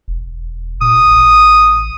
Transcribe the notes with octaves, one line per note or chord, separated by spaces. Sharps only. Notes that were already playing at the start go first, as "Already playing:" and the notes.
E1
A#2 D#6
A1